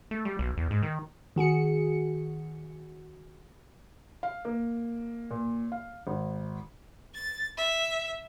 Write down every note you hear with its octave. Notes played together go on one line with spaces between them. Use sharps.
A3
G3
B1
E2
G#2
D#3
D#3 F#4 G#4 C#7
F5
A#3
A#2
F5
G#1
A6
E5